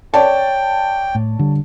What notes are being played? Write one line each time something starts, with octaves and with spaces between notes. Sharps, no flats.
C#5 D5 G5 A5
A2
D3 G3